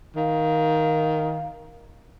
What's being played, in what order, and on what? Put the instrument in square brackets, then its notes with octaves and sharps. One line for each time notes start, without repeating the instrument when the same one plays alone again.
[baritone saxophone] D#3 [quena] F5